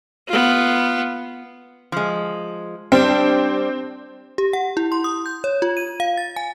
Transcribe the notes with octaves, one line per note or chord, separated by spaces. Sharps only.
B3 F4
F3 G#3
G3 C4 D4
G4
F#5
E4
C6
D#6
G6
C#5
F4
D#7
F5
A6
G#5